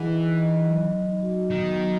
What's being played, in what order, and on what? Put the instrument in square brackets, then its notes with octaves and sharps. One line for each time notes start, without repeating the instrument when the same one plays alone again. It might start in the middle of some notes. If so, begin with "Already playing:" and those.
Already playing: [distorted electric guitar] E3 [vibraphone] D#4 G#4 D#5 F#5
[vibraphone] D#4
D#5
F#3
D#4
F#4
[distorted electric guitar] D#3 [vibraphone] B3
[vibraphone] F#3